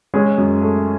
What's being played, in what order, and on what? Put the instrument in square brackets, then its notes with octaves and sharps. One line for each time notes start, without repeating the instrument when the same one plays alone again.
[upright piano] G#3 C#4 G#4
F#2
A3